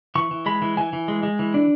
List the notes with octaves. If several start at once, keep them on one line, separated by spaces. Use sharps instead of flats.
E3 C#6
E3
G#3 B5
E3
E3 G#5
E3
G#3
G#3
E3
D4